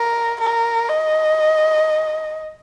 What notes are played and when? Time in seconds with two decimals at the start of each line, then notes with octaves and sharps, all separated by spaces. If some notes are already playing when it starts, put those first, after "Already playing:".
Already playing: A#4
0.41 A#4
0.89 D#5